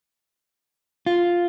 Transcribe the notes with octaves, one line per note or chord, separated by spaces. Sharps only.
F4